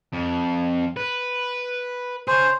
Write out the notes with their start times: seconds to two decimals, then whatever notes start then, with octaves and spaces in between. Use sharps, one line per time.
0.13 F2
0.97 B4
2.28 G#4 C5 C#5